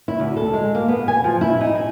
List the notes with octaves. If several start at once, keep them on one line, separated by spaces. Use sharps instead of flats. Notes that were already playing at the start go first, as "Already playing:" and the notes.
E4
D2
A4
G#3
A#3
B3
G#5
F3
E4
D#4
G#5